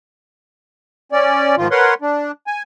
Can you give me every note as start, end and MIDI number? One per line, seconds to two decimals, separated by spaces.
1.12 1.55 61
1.12 1.55 74
1.57 1.68 44
1.57 1.68 51
1.57 1.68 53
1.57 1.68 65
1.71 1.94 70
1.71 1.94 71
1.71 1.94 73
1.71 1.94 78
1.71 1.94 84
2.02 2.31 62
2.47 2.63 80